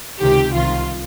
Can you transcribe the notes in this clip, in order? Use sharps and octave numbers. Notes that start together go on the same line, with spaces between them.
C#2 C3 D#3 G4
C2 C3 D#3 F4